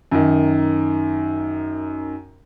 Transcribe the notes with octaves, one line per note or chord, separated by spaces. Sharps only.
F#2 D#3